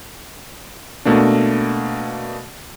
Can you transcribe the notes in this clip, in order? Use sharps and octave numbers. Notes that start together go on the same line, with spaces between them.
B2 A3 A#3 D4